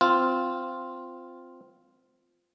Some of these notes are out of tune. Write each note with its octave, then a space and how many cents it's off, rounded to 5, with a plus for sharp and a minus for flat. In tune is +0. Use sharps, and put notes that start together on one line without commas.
C4 -10 F4 +0